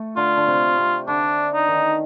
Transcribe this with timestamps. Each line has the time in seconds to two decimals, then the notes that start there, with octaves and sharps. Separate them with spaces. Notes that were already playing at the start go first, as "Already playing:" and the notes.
Already playing: A3
0.17 D3 F4
0.37 D3
0.47 C3
0.78 C3
1.08 D3 D4
1.54 D#4
1.68 D#3